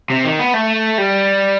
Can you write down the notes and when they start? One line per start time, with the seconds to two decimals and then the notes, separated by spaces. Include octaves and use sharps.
0.10 C3
0.24 D#3
0.39 B3
0.54 A3
0.98 G3